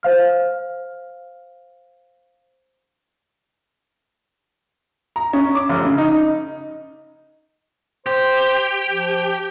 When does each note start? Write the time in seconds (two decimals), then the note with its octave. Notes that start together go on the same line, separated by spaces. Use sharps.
0.03 C5 F5 F6
5.16 A#5
5.33 C#4
5.55 D6
5.69 F1
5.85 C#3
5.98 D#4
8.06 G4 C5
8.89 F3